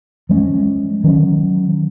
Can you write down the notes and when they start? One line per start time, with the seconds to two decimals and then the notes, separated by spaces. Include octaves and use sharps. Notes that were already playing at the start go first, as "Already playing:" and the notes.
0.29 F3 G#3 C#4
1.04 D#3 F#3 C#4